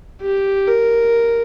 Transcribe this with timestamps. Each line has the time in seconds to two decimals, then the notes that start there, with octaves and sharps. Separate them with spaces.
0.22 G4
0.67 A#4